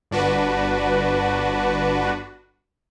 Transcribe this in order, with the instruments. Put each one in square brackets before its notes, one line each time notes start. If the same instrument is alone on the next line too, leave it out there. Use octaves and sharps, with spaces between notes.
[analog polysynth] G1 D4 F#4 B4